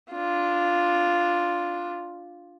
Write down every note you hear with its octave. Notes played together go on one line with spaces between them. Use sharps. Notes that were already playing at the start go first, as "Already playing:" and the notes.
D4 F4